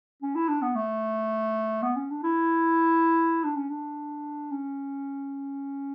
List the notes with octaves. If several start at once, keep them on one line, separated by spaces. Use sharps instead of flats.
C#4
E4
D4
B3
A3
B3
C#4
D4
E4
D4
C#4
D4
C#4